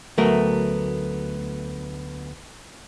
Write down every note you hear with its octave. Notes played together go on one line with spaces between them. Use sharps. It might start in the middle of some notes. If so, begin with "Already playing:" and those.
D2 F#3 A3 B3 A#4